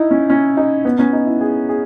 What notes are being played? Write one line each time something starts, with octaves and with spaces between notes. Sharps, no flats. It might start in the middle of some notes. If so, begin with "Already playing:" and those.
Already playing: D#4 E4
C#4
C#4
D#4
B3
C#4
D#4
E4
G#4
G#4